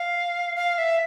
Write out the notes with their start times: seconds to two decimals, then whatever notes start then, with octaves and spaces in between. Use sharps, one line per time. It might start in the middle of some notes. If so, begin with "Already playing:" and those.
Already playing: F5
0.56 F5
0.78 E5